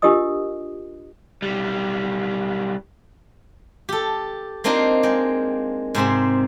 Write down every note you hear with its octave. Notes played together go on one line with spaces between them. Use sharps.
D4 F4 G4 A#4 D#5 D#6
B1 G3
G4 A4
A#3 C4 D4 D#4 F4 A#4
G#3 G5
G#2 C3 C4 G#4